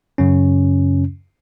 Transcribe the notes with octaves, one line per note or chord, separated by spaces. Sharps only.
F#2 C#3 C#4